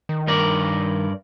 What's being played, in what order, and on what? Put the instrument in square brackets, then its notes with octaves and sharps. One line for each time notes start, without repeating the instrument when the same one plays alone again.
[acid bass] D#3
[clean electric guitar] G2 A#4 D5